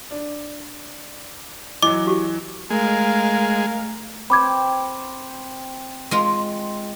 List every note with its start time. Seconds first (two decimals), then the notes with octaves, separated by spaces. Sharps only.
0.11 D4
1.83 E3 F#3 D#5 D6
2.07 F#4 G4
2.70 G#3 A3 A#4 F5
4.30 C4 G5 B5 D6 G#6
6.11 G#3 F4